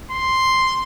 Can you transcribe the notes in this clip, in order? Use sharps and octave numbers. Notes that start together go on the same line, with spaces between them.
C6